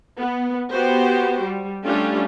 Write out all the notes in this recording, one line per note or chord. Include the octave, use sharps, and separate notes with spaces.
B3
B3 F#4 G4 C5
G3
G3 A3 C#4 D4 F4 G4